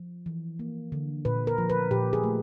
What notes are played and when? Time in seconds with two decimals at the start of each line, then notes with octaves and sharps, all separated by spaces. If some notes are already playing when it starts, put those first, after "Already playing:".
Already playing: F3
0.26 E3
0.59 A#3
0.92 D3
1.25 A#2 B4
1.47 A#4
1.58 F3
1.70 B4
1.91 A#2 G4
2.13 G#4
2.24 A3